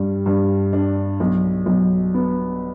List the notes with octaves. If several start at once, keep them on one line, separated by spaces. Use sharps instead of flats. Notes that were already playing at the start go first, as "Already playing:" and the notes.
Already playing: G2 G3
G2
D4
B1
B1
B3